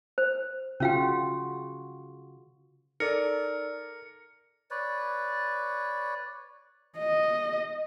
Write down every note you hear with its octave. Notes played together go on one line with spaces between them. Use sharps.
C5
C#3 C#4 F4 F#4 F5 G5
D#4 A4 A#4 D5 C#7
B4 C#5 D5
D#5